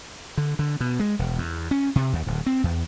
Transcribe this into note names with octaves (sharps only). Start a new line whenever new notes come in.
D3
D3
B2
G#3
E1
E2
C#4
C3
D#2
D1
C4
E2